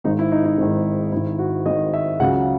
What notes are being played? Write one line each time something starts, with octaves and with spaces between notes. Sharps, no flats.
G#1 G#2 D#3 D#4
E4
D#4
E4
G#1 G#2 D#3
G#1 G#2 D#3 E4
F#4
G#1 G#2 D#3 D#5
E5
C#2 C#3 F#3 F#5